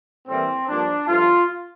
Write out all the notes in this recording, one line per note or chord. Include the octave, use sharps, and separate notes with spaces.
A2 E3 G3 A#3 C4
G2 F3 A#3 D4
G2 F3 A3 F4